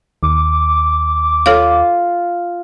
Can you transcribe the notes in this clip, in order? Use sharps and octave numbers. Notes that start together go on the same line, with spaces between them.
D#2 D6
F4 A4 C#5 F5